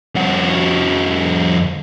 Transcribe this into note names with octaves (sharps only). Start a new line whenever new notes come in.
F2 F#4